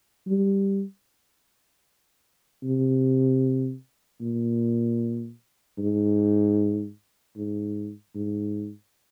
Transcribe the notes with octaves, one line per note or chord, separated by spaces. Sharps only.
G3
C3
A#2
G#2
G#2
G#2